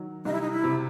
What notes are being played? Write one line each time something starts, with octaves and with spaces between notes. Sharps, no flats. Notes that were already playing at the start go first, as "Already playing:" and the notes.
Already playing: D#3 F#3
C2 D#4
E4
D#4
E4
C3